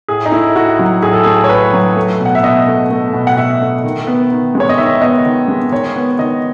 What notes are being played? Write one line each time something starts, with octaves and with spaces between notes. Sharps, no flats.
A2 G#4
D#4
A3 E4
A2 F#4
F#3
A2 G#4
A4
A3 G#4
C#5
A2 B4
F#3
A3
B2
F#5
E5
B2 D#5
A3
A3
B2
F#5
B2 E5
A3
D#3
B3
D#3
G#3
C#5
D#5
D#3 E5
B3 D#5
D#3
G#3
D#3 C#5
B3
D#3 D#5